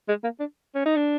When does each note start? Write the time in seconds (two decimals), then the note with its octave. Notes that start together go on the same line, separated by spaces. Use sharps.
0.08 G#3
0.24 A#3
0.40 D4
0.75 C#4
0.86 D#4
0.96 D4